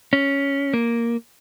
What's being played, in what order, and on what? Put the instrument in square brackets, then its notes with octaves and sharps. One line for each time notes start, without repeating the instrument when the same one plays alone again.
[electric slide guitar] C#4
A#3